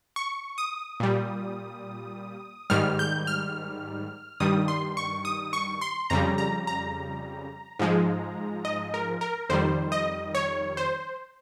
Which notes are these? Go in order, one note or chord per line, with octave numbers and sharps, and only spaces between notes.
C#6
D#6
A#2 G3
G#2 D#3 G3 F6
G6
F6
G2 D#3 G3 D#6
C6
C#6
D#6
C#6
C6
F2 C#3 G3 A#5
A#5
A#5
G#2 F3 G#3
D#5
A#4
A#4
F2 D#3 G3 C5
D#5
C#5
C5